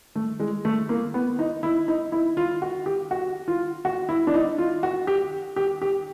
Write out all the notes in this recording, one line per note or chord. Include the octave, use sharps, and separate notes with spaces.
A3
G#3
A3
A#3
B3
D#4
E4
D#4
E4
F4
F#4
G4
F#4
F4
F#4
E4
D4
D#4
F4
F#4
G4
G4
G4